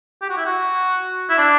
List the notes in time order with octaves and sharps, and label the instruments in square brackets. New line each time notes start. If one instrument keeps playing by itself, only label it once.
[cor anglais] G4
F#4
E4
F#4
E4
D4